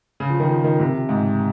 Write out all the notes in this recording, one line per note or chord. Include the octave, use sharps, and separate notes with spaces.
C#3
F3
D#3
F3
D#3
C3
G#2